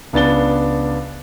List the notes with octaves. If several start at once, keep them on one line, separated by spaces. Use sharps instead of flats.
C#2 B3 D4 A6 G7